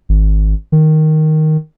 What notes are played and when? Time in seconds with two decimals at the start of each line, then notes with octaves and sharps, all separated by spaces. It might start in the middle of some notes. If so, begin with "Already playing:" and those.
0.09 G#1
0.72 D#3